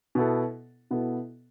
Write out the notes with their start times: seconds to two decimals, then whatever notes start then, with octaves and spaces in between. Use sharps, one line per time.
0.15 B2 B3 E4 A4
0.91 B2 B3 E4 A4